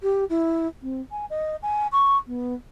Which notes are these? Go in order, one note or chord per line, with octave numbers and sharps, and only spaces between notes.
G4
E4
C4
G#5
D#5
G#5
C#6
B3